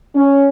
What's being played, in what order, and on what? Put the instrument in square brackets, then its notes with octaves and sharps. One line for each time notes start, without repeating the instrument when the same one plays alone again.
[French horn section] C#4